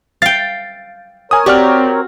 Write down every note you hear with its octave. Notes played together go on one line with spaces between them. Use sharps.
F5 G5 A6
A#4 C#5 G#5 D#6
C4 F#4 G4 D5 F6